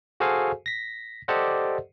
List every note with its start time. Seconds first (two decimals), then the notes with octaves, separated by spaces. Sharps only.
0.20 F#4 G#4 A4 C5 F5 G#5
0.66 A#6 B6
1.28 G4 A4 C5 D5 D#5 F#5